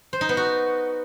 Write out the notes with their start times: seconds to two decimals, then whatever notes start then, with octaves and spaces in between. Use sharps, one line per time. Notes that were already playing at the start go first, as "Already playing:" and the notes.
0.13 C5
0.21 D#4
0.29 B3
0.37 F#4